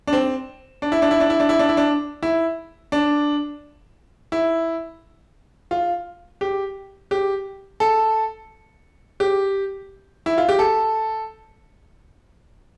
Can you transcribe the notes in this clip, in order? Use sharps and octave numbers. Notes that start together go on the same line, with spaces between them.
D4
C4
D4
E4
D4
E4
D4
E4
D4
E4
D4
E4
D4
E4
D4
E4
F4
G4
G4
A4
G4
E4
F4
G4
A4